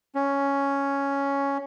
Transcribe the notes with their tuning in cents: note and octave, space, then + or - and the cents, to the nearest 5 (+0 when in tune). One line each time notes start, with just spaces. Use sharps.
C#4 +5